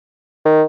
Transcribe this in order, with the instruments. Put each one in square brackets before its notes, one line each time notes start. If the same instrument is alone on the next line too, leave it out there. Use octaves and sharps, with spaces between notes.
[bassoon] D#3